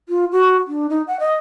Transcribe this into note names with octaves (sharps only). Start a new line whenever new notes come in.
F4
F#4
D4
D#4
F#5
D#5